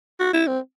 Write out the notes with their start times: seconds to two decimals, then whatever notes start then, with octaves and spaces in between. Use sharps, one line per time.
0.20 F#4
0.33 E4
0.47 C4